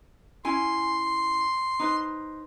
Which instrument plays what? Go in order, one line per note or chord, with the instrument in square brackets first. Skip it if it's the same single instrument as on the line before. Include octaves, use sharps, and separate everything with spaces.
[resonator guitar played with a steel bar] C#4 E4 G#5 [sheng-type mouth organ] C6
[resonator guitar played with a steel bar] D#4 B4 C5